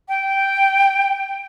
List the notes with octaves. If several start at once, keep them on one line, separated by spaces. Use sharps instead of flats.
G5